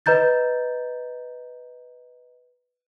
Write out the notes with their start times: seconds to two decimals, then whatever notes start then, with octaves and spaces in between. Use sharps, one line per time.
0.06 B4 D#5 A#5 G6 A6